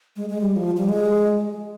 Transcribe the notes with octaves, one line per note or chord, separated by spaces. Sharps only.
G#3
G#3
G3
F3
G3
G#3